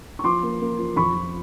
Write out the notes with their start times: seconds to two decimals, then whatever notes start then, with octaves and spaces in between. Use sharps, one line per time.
0.19 C#6
0.24 F3 C6 D6
0.43 A#3
0.61 A#3
0.78 F3
0.96 F2 B5 C#6
1.15 F3